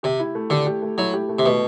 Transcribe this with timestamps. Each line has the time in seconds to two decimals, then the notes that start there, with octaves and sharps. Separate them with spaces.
0.03 C3 G4
0.19 E4
0.35 A3
0.50 D3 G4
0.66 G4
0.82 A3
0.98 F#3 E4
1.14 G4
1.29 A3
1.39 C3
1.45 B2 A3